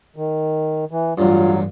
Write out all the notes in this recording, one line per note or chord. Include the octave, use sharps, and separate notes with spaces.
D#3
E3
A1 G2 F#3 F4